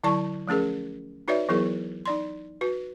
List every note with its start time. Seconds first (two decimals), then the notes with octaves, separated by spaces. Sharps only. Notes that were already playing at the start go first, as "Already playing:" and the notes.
0.04 D3 F#3 E4 D5 A5 C#6
0.47 F3 A3 C#4 G#4 A#4
1.28 D#4 F#4 B4 C#5 D5 E5
1.49 E3 F#3 B3 E4 G#4 A#4
2.06 D#4 D5 C6
2.61 F#4 B4